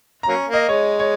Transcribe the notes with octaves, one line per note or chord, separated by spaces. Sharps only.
F#3 A#3 C#4 A#5
A#3
D#5
G#3 C#5
C#5